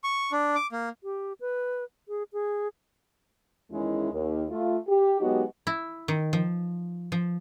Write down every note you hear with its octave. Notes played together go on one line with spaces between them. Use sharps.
C#6
D4
D6
A#3
G4
B4
G#4
G#4
E2 D#3 G#3 C#4 E4
D#2
A3 F4
G4
F#3 G#3 B3 D#4 F#4 G4
E4
D#3
F3
F3